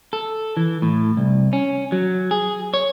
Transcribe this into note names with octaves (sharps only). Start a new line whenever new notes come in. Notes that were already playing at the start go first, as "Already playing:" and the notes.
A4
E3
A2
C2
C#4
F#3
G#4
C#5